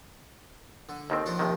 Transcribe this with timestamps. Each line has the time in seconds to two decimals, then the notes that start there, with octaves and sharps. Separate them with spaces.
0.89 D3
1.10 D#2 D#3 C4
1.26 F3 D4 F4
1.39 D#2 C3 D#3